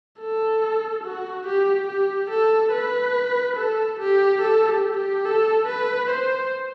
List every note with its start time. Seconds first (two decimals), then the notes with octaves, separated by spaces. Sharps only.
0.20 A4
1.04 F#4
1.46 G4
1.88 G4
2.30 A4
2.72 B4
3.56 A4
3.99 G4
4.41 A4
4.68 G4
4.97 G4
5.25 A4
5.67 B4
6.10 C5